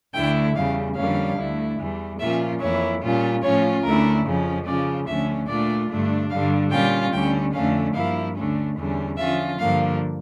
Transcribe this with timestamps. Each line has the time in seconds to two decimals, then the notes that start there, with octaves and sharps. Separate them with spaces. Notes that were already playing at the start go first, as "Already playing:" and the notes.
0.14 D2 D3 A3 E4 G5
0.55 E2 C#3 G3 F5
0.96 F2 D3 G3 A#3 C#4 F5
1.37 D2 D3 A3 E4
1.79 E2 E3 G3
2.19 A#2 F3 A#3 C#4 F4 E5
2.60 F2 E3 A#3 E4 C#5
3.02 A#2 G3 C#4 F4
3.43 A2 F3 C#4 F4 C#5
3.84 D2 D3 A3 C#4 E4 A#4
4.26 F2 C#3 F3 C#4
4.66 C#3 F3 C#4 F4 D5
5.07 D2 D3 F3 A3 C#4 E5
5.48 A#2 A3 D4 F4 D5
5.90 G2 D3 A3 D4
6.30 G2 D3 G3 F5
6.71 A#2 G3 C#4 F4 G5
7.13 D2 D3 G3 C#4 G5
7.53 F2 D3 A3 C#4 F5
7.94 G2 F3 A#3 E4 F5
8.37 D2 D3 A3 C#4
8.77 E2 D3 G3 C#4
9.18 D3 F3 C#4 F4 E5
9.59 G2 D3 F3 A#3 F5